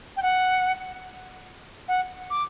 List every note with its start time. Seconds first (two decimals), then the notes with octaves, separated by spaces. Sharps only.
0.17 G5
0.22 F#5
1.88 F#5
2.30 D6